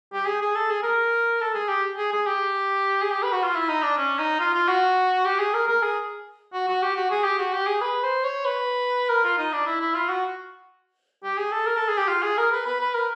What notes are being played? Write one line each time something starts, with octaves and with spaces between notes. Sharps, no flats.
G4
G#4
G#4
A4
G#4
A#4
A4
G#4
G4
G#4
G#4
G4
G#4
G4
B4
F#4
F4
E4
D#4
D4
C#4
D#4
F4
F4
F#4
G4
G#4
A#4
A#4
G#4
F#4
F#4
G4
F#4
G#4
G4
F#4
G4
G#4
B4
C5
C#5
B4
A#4
F4
D#4
D4
E4
E4
F4
F#4
G4
G#4
A4
A#4
A4
G#4
G4
F4
G#4
A#4
B4
B4
B4
A#4